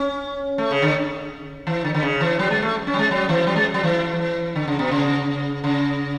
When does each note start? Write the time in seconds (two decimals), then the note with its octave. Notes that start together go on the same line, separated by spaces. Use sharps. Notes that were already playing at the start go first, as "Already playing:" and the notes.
Already playing: C#4
0.58 A3
0.71 C#3
0.82 D3
1.67 E3
1.84 D3
1.94 D3
2.02 C#3
2.21 E3
2.39 F#3
2.50 G#3
2.62 A3
2.87 C#4
2.94 F#3
2.99 G#3
3.11 F#3
3.29 E3
3.47 F#3
3.56 G#3
3.74 F#3
3.83 E3
4.56 D3
4.68 C#3
4.79 B2
4.91 C#3
5.64 C#3